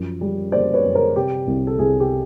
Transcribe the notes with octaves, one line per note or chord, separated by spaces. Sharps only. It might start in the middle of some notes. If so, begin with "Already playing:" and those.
Already playing: F#2 F3
G3
A#3 C5 D5
B4 C#5
F#2
A#4 C5
C3 G4
C2
A4
C2 G#4
G4